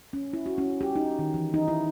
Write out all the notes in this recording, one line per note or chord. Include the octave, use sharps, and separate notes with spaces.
C#4
E4
F#4
C#4
G4
D#4
D#3
E3
D#4
E4